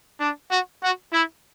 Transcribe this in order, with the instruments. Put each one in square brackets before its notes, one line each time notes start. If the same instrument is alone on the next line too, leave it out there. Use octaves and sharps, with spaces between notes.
[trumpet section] D4
F#4
F#4
E4